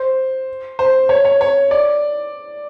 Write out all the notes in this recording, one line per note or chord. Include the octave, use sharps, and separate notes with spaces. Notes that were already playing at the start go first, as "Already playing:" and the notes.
Already playing: C5
C5
C#5
C#5
C#5
D5